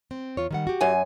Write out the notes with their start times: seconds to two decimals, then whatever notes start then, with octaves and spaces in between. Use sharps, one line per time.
0.11 C4
0.37 E2 F4 C#5
0.51 D#3 G3 F#5
0.67 F#4 G4
0.81 F#2 G#5